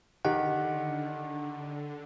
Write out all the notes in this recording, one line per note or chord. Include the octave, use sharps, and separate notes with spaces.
D3 D#3 G4 F#5